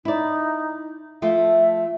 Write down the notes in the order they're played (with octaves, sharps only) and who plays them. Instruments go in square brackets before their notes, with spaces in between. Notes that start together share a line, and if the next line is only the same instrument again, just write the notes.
[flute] D#4 [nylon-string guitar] E4 D5
[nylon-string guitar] F3 A3 F4 [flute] E5